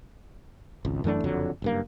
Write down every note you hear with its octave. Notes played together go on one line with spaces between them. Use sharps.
G#1 C#2
F#2 E3 A3 D4
F#1 F2 D3 F#3
F#1 G2 A#3